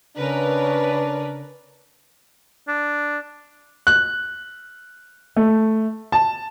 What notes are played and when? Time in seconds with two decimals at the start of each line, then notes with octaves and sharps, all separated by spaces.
0.16 C#3 D4 A#4 B4
2.68 D4
3.87 F#6
5.36 A3
6.12 A5